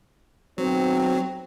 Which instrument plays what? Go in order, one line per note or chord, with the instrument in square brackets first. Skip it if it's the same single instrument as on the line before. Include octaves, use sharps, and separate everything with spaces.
[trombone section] B1 C4 [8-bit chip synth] F#3